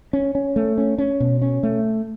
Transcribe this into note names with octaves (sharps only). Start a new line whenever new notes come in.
C#4
C#4
A3
C#4
C#4
B2
C#4
A3